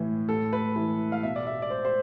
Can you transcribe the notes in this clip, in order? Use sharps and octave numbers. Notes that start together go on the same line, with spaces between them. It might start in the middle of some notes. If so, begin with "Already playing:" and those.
Already playing: A2 E3
A2 A4
B4
E3
F5
B2 E5
D5
E5
D5
C5
C5